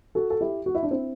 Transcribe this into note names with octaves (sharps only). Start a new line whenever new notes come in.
F#4 A4
A4
E4 G4
F#4
E4
D4
C4 E4